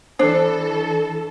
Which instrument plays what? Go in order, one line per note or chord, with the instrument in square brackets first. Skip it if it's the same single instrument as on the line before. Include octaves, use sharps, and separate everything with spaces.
[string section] E3 A4 [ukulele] D4 [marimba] C5